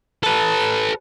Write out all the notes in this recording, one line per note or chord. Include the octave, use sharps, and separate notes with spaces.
A4 B4